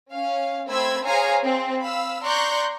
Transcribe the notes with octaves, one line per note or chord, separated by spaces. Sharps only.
C#4 F5
A3 C4 C5 B5 E6 G#6
G#4 C5 C#5 F5 G#5 A#5
C4
F5 B5 E6
D5 A#5 C6 C#6 F#6 G6